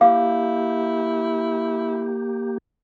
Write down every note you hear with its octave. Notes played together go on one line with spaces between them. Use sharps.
A#3 E4 G4 F5